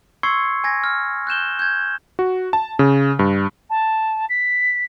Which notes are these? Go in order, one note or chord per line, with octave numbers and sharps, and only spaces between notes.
C6 C#6 E6 G#6 C7 C#7
G#5 G#6 A#6
F6
F#6 G6 E7 G7
G6 G#6
F#4
A5
C#3
G2
A5
B6